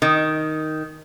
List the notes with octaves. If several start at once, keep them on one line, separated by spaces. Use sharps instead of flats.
D#3